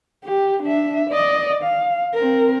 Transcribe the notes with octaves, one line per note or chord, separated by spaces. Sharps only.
G4
D4 E5
D5 D#5
F5
C4 A#4